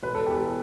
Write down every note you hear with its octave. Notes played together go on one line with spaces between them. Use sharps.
E1 B4
A4
E2 G4
A4